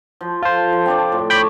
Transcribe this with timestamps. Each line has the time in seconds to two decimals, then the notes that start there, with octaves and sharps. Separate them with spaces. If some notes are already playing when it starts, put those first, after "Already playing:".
0.21 F3
0.43 F4 A4 C5
0.72 F3
0.86 C4 D4 D5
1.12 A2
1.30 C#5 D5 G5 B5